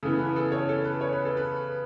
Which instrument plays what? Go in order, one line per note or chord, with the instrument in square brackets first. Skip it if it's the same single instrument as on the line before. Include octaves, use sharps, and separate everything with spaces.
[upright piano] C#3 E3 B3 A4
B4
A4
C#5
A4
B4
C#5
B4
A4
B4